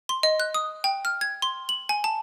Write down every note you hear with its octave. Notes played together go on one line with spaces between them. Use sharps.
C6
D#5
F#6
D#6
G5
F6
G#6
C6
F#7
G#5
A5